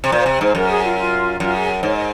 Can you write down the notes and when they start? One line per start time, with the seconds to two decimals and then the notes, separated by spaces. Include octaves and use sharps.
0.04 C3
0.12 A#2 C5
0.26 C3
0.41 G#2 C5
0.55 F#2 A#4
0.69 G#4
0.84 F4
0.97 F4
1.40 F#2 F4
1.54 G#4
1.83 G#2 C#5
1.94 D#5